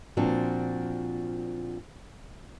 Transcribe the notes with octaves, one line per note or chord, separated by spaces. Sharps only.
A#2 F3 C4 D4 F#4